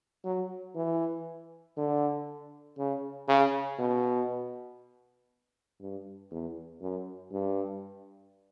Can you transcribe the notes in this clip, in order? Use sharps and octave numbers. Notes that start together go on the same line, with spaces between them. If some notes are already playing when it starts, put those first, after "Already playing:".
F#3
E3
D3
C#3
C#3
B2
G2
E2
F#2
G2